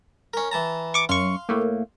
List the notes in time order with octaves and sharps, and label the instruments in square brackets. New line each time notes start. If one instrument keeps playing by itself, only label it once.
[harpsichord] C#4 A#4
E3 A5 A#5
[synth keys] C#6 D6
[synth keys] F#2 C#6 [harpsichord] F5 C6
[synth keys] A2 A3 A#3